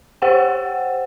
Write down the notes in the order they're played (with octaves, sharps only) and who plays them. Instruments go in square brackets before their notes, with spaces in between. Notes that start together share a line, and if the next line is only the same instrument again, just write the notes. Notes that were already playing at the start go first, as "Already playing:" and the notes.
[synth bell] G4 C5 F#5 G5